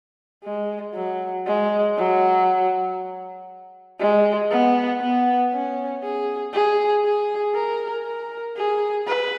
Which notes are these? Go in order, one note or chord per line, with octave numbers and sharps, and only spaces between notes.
G#3
F#3
G#3
F#3
G#3
B3
B3
C#4
G#4
G#4
G#4
A#4
A#4
G#4
B4